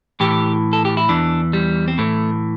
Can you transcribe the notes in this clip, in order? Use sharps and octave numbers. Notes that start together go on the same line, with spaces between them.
A2 E3 G4
A4
G4
E4
E2 E3 D4
G3
C4
A2 E3 A3